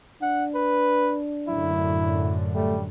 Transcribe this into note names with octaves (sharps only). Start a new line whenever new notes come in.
D4 F#5
B4
F#2 A2 D3 E4
G3 A3